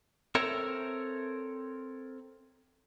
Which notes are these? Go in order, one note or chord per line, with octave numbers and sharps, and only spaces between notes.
C4 A4 A#4 C#5 E5